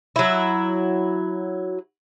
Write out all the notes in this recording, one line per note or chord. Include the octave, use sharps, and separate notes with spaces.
F#3 E4